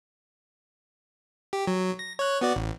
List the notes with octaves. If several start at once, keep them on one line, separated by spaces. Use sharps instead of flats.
G4
F#3
A#6
C#5 F#6
B3 F#4 D5
A1